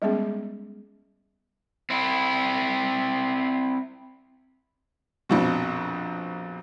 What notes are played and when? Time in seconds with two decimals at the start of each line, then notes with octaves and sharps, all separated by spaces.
0.02 G3 G#3 B3 C#4 G#4
1.90 C4 E4
5.29 A#1 F2 B2